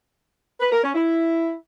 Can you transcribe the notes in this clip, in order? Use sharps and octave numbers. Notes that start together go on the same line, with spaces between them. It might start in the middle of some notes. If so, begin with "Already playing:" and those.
B4
A#4
C#4
E4